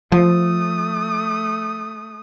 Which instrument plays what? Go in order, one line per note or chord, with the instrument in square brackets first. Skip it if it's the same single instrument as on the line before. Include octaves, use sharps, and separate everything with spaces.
[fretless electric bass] F3 [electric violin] A3 D#6